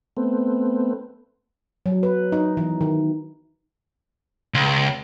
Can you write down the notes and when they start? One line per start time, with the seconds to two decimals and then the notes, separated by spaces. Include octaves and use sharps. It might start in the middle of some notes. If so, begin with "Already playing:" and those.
0.17 A3 B3 C4
1.86 F#3
2.03 B4
2.32 D#4
2.57 E3
2.81 D#3
4.54 C#2